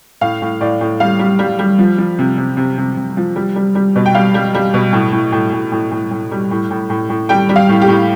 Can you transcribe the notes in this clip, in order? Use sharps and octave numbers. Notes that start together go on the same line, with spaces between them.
A2 F5
A2
A2 D5
A2
G3 F5
G3
G3
G3
F3
F3
C3
C3
C3
C3
C3
F3
G3
G3
G3
B2
G5
G3 F5
G3
G3
B2
A2
A2
A2
A2
A2
A2
A2
G3
A2
A2
A2
A2
G3 G5
G3
F5
A2
G4
A2